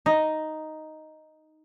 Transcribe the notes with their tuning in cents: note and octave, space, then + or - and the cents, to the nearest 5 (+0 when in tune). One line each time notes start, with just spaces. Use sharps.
D#4 +0 D#5 +0